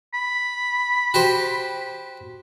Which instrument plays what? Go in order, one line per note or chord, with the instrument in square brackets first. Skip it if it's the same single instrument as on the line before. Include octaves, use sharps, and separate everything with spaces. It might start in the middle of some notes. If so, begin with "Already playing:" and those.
[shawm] B5
[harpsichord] F#4 G4 C5